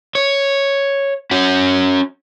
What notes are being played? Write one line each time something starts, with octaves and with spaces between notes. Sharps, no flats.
C#5
C#4 F#4